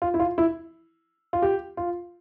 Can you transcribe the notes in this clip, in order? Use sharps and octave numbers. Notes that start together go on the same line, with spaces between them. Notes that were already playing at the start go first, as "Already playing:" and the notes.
F4
E4
F4
E4
F4
G4
F4